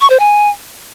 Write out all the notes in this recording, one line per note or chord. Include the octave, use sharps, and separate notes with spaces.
C#6
C5
G#5